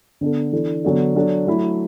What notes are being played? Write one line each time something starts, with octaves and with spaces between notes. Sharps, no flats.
D3 B3 D4 A4
E3 D4 A4
D3 F#3 B3 D4 A4
F#3 D4 A4
F#3 A3 E4 A4